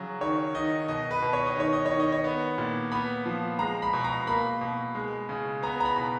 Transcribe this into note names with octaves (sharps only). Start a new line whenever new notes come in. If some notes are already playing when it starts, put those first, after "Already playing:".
Already playing: C#3 F#3
D#3 C#5
D#3 D#5
B2 D#5
B4
B2
C#5
D#5
D#3 C#5
D#5
D#3 C#5
D#5
C#5
B3
A#2
B3 B5
F3
G#3 A#5
B5
B2
A#5
A#3 B5
B2
G#3
C#3
B3 A#5
A#5
B5
B2